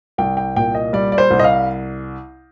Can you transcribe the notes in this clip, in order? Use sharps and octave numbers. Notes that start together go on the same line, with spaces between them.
C2 G5
G5
A#2 G5
D#5
G3 D5
D5
C5
C2
D#5
F5